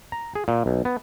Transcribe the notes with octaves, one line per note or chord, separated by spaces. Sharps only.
A#5
G#4
A#2
B1
B3